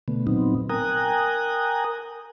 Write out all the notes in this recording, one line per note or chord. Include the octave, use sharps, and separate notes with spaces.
B2 D3 A3 B3
A#2 F#3 B3 C4 D#4
A#4 G5 G#5 A#5 D#6 F#6